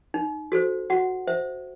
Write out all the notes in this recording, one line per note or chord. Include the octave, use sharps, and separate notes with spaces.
D#4
F#4 A4 C5
F#4 F#5
C5 E5